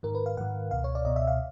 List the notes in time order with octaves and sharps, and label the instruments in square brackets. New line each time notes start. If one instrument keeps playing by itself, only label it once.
[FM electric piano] G#2 D#3 A#4
B4
F5
G#2 D#3 F#5
C#2 B2 F5
C#5
D5
C#2 B2 D#5
E5
F5